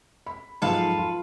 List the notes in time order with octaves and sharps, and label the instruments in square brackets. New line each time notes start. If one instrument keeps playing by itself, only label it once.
[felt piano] B5
[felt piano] G#2 F3 F#3 [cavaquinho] A4 B4 F5
[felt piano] F4